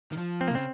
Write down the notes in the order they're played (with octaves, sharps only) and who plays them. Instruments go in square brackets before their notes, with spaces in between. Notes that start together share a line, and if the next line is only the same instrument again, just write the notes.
[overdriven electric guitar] D#3
F3
[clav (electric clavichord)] C4
A#3
[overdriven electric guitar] C3
[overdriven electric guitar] C#3 [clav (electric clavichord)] C4